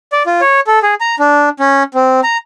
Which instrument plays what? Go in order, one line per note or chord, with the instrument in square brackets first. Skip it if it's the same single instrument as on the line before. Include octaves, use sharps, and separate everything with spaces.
[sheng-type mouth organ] D5
F4
C#5
A4
G#4
A#5
D4
C#4
C4
A#5